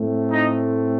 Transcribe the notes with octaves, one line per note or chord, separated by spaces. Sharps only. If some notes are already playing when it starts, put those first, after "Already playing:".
Already playing: A2 A3 C4
D#4 D#5